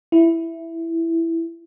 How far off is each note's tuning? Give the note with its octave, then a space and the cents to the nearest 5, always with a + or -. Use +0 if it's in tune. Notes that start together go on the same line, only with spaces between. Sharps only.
E4 +5